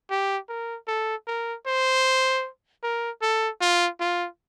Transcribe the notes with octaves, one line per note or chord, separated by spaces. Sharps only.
G4
A#4
A4
A#4
C5
A#4
A4
F4
F4